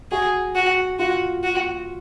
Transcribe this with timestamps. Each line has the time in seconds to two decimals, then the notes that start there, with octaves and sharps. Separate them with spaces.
0.11 F#4 G#4
0.55 F#4
0.99 F4 F#4
1.43 F#4